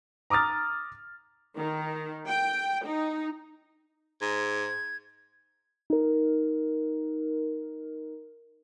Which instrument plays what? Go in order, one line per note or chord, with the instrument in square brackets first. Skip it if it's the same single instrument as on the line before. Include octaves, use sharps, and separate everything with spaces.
[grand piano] A#5 D6 D#6 F6 A6
[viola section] D#3
G5
D#4
[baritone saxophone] G#2 [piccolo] G#6
[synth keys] D#4 A#4